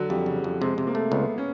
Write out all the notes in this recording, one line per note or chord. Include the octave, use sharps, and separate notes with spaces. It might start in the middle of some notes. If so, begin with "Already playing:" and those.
Already playing: D3 F#3
F2 G3
C#3
F2
C3 G#3
C3
A#3
A3
C#2 B3
C#4